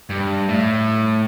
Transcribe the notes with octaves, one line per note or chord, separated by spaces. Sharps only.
G2
A2